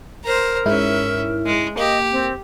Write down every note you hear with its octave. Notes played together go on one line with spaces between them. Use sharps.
A#4 C5 A#5
G#2 C#4 E4 E5
G#3
A#3 G4 D#5
C4